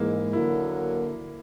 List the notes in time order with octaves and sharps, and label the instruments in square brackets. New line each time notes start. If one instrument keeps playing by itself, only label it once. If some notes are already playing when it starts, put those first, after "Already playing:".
Already playing: [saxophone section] G#2 E3 G#3 [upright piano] A#3 E4
[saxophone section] D3 F#3 A#3 [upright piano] E4